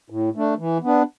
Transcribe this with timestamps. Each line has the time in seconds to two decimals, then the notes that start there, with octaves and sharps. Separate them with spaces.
0.10 A2
0.35 A3 D4
0.59 E3
0.83 B3 D4